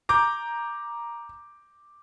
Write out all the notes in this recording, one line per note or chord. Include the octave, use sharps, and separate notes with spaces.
A#5 D6 G6